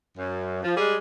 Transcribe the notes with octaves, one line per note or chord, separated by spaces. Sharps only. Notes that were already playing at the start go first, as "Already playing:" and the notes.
F#2
F3
G3 G#3 G#4